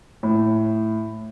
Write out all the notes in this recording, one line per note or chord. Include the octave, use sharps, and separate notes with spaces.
A2